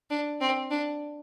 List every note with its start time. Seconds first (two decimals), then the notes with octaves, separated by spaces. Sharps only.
0.10 D4
0.41 C4
0.71 D4